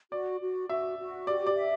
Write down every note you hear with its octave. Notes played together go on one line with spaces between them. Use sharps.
F#4 D5
F#4
F#4 E5
F#4
G4 D5
D5
E5